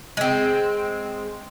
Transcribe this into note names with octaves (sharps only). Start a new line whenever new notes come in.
G#3 C4